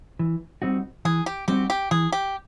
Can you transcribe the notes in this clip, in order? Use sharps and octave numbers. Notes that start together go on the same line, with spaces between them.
E3
G3 C4 D#4 F#4
E3 G#4
G4
G3 C4 D#4 F#4 G4
G4
E3 G#4
G4